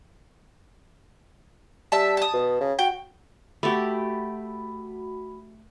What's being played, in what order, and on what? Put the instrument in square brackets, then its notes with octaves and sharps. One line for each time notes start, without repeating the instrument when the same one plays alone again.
[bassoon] G3 [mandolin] E5 A5
[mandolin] A5 D#6
[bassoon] B2
C#3
[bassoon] F#4 [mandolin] G5
[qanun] A3 G4 [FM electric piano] F#4 B5